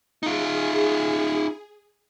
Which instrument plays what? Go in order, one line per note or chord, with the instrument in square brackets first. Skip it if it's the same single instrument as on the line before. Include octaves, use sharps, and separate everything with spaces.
[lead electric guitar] D#4 F4 [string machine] G#4